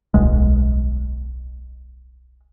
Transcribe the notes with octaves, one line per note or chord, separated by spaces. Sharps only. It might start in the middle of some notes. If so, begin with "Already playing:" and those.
D1 B1 G#3